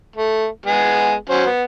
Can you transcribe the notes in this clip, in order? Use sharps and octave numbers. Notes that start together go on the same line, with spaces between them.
A3
G#3 B3 G#4
F#3 C#4 C5
B3